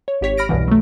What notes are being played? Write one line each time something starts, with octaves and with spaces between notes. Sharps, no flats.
C#5
G#1 G4 C#5 B6
B5 F6 A#6 D7
C2 G2 B2 E3
F#3 A3